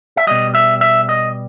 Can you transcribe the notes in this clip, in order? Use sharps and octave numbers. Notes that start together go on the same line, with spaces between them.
E5
B2 G3 D#5
E5
E5
D#5